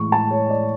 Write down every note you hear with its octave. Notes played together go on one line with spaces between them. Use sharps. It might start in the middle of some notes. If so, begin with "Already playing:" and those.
Already playing: A2 E3 G#3 C#6
A5
C#5
D5